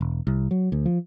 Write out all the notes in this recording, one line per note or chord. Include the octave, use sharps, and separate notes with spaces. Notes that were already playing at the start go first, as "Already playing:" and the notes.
E1
C2
F#3
D2
F3